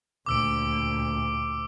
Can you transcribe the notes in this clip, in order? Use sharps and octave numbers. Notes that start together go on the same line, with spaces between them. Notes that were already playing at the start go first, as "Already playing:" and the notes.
D2 A#2 D6 E6 D7